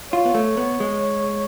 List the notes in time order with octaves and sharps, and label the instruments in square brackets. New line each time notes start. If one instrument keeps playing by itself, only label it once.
[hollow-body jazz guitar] F4 [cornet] C#5
[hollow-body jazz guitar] B3
A3
B3
G#3